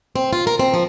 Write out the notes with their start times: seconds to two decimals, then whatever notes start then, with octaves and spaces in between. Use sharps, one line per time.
0.16 C4
0.33 F4
0.47 A#4
0.59 C4
0.74 F3